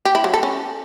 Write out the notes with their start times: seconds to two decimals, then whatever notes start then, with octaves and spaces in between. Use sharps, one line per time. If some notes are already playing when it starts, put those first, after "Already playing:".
0.05 G4
0.15 E4
0.24 F#3
0.34 A4
0.43 C#4